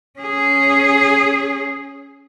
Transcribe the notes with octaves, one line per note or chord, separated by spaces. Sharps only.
C#4 G#4